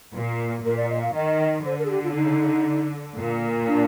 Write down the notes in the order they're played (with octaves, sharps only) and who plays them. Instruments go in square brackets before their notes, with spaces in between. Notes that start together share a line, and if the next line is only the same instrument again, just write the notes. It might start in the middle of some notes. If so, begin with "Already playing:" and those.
[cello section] A#2
[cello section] A#2 [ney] A#4
[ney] D5
D#5
F5
[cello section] D#3 [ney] D#5
[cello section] D3 [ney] C5
[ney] A#4
G#4
G4
F4
D4
D#4
[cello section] A#2
[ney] D4